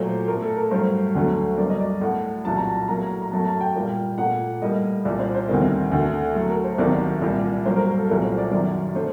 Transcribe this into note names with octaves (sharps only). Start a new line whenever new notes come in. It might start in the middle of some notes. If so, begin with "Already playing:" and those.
Already playing: A#2 F#3 A3 C5
A2 A3 A#4
A4
A#4
G2 F#3 A3 C5
D2 D3 F#3 A3
G2 F#3 A#3 D5
D#5
D5
A2 A3 F#5
C2 A#2 F#3 A5
A#5
A5
A2 F#3 A#3 A#5
A#5
F#2 F#3 A3 A5
A5
G5
A#2 G3 A#3
A#2 A3 F#5
A2 G3 A#3 D#5
C2 A#2 G3 D5
C5
C5
D2 C3 D#3 G3 A#3
D2 D3 A3
A2 F#3 A3 A4
A#4
C5
C2 C3 D#3 F#3 A#3 D5
C2 A#2 G3 A#3
G2 F#3 A#3 C5
A#4
A#4
A4
C2 A#2 F#3 A3 A#4
C5
D5
F#2 D#3 F#3 D5
D3 A3 C5